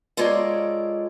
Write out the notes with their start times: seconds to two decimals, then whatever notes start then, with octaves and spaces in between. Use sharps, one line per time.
0.17 G#3 F4 A4 A#4 C#5 D5